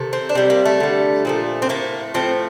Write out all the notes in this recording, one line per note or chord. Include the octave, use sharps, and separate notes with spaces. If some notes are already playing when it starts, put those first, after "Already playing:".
Already playing: C3 D#3 A3
C4
D4
C3 G3 C4
A#3
A3
D3 G3
A#2 F3 A3
C4
A2 A3 A#3
A2 F3 A3 C4